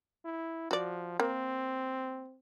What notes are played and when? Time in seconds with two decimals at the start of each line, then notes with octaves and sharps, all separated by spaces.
0.25 E4
0.71 F3 F#4 D5
1.20 A#3 C4